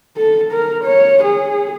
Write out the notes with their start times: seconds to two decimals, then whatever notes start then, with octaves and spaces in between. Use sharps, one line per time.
0.17 A4
0.52 A#4
0.84 C#5
1.23 G#4